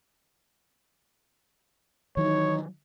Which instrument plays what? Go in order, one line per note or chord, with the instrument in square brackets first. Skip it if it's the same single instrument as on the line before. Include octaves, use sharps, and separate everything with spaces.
[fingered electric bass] D#3 E3 F#3 [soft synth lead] D#4 [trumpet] C#5